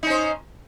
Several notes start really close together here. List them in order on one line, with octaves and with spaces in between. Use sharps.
D#4 C#4 C5